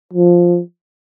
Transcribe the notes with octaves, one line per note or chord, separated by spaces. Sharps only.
F3